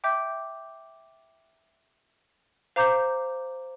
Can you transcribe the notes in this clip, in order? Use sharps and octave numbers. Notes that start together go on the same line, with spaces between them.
E5 G5 D6 G6
C5 F5 A#5 D6 G6